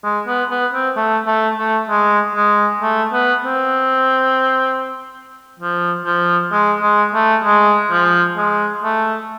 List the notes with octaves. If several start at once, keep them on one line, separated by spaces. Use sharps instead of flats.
G#3
B3
B3
C4
A3
A3
A3
G#3
G#3
A3
B3
C4
F3
F3
G#3
G#3
A3
G#3
F3
G#3
A3